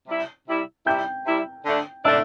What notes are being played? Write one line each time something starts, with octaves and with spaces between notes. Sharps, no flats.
C3 G3 E4
C3 G3 E4
C3 G3 E4 G5 G6
C3 G3 E4
D3 A3 D4
D3 A3 D4 E5 E6